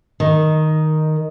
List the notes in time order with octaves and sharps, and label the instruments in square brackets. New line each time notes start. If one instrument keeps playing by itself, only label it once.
[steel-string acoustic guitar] D#3